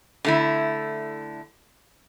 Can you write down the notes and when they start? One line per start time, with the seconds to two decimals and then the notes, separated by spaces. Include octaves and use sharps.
0.25 D3 A3 E4